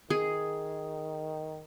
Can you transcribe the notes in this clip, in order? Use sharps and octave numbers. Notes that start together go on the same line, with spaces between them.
D#3 G#4